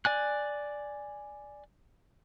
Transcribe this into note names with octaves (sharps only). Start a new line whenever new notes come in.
D5 G#5 F#6